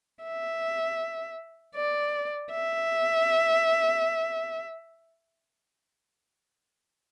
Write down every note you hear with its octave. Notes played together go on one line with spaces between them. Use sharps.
E5
D5
E5